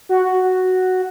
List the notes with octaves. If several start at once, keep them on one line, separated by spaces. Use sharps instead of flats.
F#4